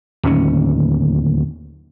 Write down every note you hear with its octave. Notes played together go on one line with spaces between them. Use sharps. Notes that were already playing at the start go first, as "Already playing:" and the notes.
D1 D#2 C#4